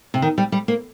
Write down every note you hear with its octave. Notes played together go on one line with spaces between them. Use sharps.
C3
D#3
G3
G3
A#3